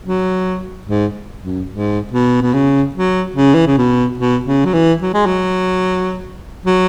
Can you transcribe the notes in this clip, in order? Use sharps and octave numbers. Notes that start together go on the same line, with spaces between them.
F#3
G#2
F#2
G#2
B2
B2
C#3
F#3
C#3
E3
C#3
B2
B2
C#3
F#3
E3
F#3
G#3
F#3
F#3